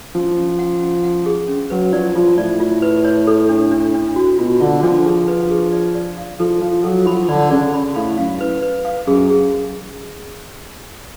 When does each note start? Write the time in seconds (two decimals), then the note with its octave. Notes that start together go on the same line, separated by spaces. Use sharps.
0.15 F3 C#4
0.36 C#4
0.59 F#5
0.81 C#4
1.04 F#5
1.26 G#4
1.48 C#4
1.70 F#3 B4
1.93 F3 D5
2.16 F3 F4
2.37 A2 D5
2.60 F4
2.82 B4
3.05 C#5
3.27 A4
3.49 D4
3.71 D4
3.94 D4
4.16 F#4
4.38 B2 F4
4.61 D3 F4
4.83 F3 D4
5.05 G#4
5.28 B4
5.50 G#4
5.72 D5
5.94 D5
6.17 F5
6.39 F3 A4
6.62 F3 F5
6.84 F#3 A4
7.06 F3 B5
7.29 D3 D5
7.51 C#3 D5
7.73 B5
7.96 A2 F5
8.18 F#2 F5
8.41 B4
8.62 B4
8.85 F5
9.07 F#2 G#4
9.30 G#4